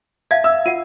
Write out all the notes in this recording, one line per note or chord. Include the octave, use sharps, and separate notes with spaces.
E5 F5 A5 G#6
E5 E6
F4 F#5 D#7